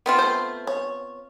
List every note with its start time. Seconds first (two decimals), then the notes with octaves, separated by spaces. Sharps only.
0.06 B3 C4 F4
0.19 A3 C5
0.67 C#5